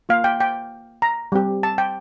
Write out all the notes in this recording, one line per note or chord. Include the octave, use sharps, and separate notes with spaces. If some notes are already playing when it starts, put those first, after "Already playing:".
A#3 F4 F5
G5
G5
A#5
G3 C4 G4
A5
G5